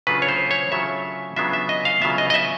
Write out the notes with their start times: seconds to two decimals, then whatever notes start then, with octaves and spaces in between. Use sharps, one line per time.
0.07 C#3 F#3 A3 D4 F4 B4
0.22 C#5
0.29 C5
0.51 C#5
0.72 C#3 F#3 A3 D4 F4 E5
1.36 C#3 F#3 B3 D4 F4 E5
1.53 E5
1.69 D#5
1.85 F5
2.02 C#3 F#3 B3 D4 F4 E5
2.18 D#5
2.30 D#5
2.34 E5